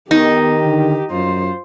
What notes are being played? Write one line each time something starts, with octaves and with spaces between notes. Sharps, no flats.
D#3 B3 D#4 G4
D3
F#2 F4 C5